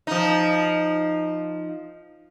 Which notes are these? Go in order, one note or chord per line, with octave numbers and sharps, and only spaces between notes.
F3 D#4